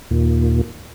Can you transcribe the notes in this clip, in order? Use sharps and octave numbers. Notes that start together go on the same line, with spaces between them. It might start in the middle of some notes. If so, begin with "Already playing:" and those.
D#2 A#2